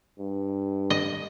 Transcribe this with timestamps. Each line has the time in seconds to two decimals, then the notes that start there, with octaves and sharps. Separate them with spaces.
0.19 G2
0.90 D#5